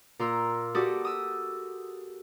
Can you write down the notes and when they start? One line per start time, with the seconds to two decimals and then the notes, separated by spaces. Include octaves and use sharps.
0.19 A#2 A#4 C6 E6
0.75 F#4 G4 A4 D5 D#6
1.05 D#6 E6